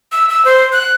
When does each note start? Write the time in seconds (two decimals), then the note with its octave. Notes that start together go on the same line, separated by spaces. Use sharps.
0.12 E6
0.29 E6
0.45 C5
0.73 F#6